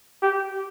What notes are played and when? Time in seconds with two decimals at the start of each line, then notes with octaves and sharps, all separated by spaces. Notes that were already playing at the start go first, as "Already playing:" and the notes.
0.22 G4